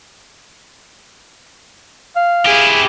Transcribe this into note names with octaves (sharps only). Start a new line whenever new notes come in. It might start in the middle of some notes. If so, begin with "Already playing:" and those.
F5
E4 G4 G#4